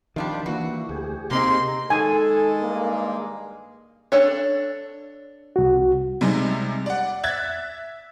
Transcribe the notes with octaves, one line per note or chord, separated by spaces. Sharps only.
D#3 F3 G3 D4 F4
E3 A#3 E4 F#4
D2 G4 G#4
C3 A#3 C4 D#4 C6
D#3 G#3 A4 G#5
G2 A#3
D4 A4 C#5
C2 F#4
C3 G3 G#3 D#4
D5 F#5
E5 F#6 G#6 A6